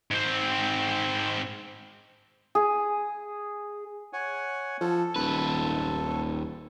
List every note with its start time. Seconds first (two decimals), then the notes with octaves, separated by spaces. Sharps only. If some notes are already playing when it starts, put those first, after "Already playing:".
0.11 G#2 C4
2.55 G#4
4.13 C#5 F#5 G#5
4.81 F3 A4
5.16 D#1 D#2 B4